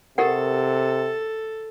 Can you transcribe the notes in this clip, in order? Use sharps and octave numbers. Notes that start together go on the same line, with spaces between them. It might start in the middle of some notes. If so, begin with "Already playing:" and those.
C3 G4 A4 A#4 F#5